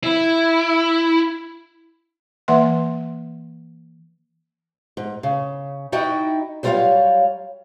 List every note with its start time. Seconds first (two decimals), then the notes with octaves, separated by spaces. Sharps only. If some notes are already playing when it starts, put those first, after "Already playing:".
0.04 E4
2.48 E3 A#3 B4 E5 F#5 C6
4.97 G#2
5.23 C#3
5.92 D#4 E4 F#4 D5 D#5 G5
6.63 F#3 G3 F4 B4 C#5 F5